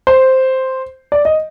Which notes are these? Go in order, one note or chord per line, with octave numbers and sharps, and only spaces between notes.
C5
D5
D#5